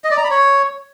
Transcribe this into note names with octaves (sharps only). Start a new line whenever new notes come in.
D#5
D5
A#5
B5
C#5